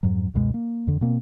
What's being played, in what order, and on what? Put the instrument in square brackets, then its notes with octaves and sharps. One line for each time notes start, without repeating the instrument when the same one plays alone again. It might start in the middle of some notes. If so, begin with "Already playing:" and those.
[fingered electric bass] F2 G#2 F#3
C#2 F#2 B2 G#3
A#3
F2 D3
B2 A#3 C4